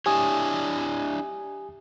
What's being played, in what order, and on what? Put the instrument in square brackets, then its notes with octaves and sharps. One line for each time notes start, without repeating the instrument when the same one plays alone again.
[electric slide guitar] D4 E4 C#5 [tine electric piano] G4 G#5 D#6